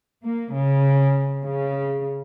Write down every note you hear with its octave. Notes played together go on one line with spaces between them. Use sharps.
A#3
C#3
C#3